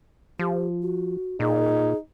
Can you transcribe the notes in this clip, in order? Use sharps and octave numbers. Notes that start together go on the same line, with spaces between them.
F3 G4
F#4
A#2 D#4 G#4